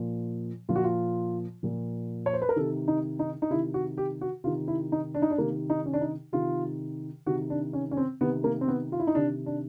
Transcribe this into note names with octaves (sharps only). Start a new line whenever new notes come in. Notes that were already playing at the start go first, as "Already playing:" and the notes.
Already playing: A#2 F3
A#2 F3 F4
F#4
F4
A#2 F3
C#5
C5
B4
A#4
C3 D#3 A4
D#4
D#4
D#4
C3 D#3 E4
F#4
G4
F#4
C3 D#3 F4
E4
D#4
D4
D#4
D4
C3 D#3 A#3
D#4
C#4
D4
D#4
C3 D#3 F4
C3 D#3 F#4
D4
C#4
C#4
C4
C3 D#3 B3
A#3
C4
B3
F4
E4
D#4
C3 D#3 D4
D4